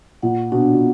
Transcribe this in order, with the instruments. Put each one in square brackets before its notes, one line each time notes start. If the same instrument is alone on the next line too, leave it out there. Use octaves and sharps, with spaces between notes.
[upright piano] A#2 [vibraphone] F#5
[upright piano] B2 [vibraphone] D4
[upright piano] B2